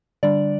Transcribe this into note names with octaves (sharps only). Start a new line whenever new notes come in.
D3 G3 D4 D5